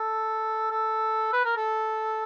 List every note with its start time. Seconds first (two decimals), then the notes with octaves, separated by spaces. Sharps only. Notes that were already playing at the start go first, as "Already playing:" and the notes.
Already playing: A4
0.71 A4
1.33 B4
1.45 A#4
1.57 A4